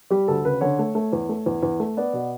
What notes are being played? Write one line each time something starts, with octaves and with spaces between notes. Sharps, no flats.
G3 G4
D2 A4
C#3 B4
D3 C#5
A3
A3
E2
A3
E2
E2
A3
B3 D5
B2